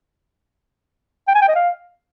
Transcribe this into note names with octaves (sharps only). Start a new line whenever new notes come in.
G5
G#5
G5
D#5
F5